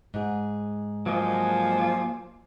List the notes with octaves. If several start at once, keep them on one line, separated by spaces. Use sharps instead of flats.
G#2 G#4
F3 F#3 G#3 A#3 D4 D#5 G#5